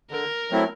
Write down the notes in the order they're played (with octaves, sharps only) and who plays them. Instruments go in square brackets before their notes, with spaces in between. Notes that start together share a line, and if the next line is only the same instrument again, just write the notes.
[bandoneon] D3 [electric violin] A#4
[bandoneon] F#3 A3 C4 E4